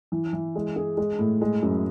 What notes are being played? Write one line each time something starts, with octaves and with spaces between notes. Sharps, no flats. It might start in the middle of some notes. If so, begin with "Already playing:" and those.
E3
E3
G#3
G#4
G#3
A2
G#3
F#2